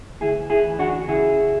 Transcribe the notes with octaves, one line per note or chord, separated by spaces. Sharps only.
D2 E4 G#4
E4 G#4
E3
D4 F#4
C#3 E4 G#4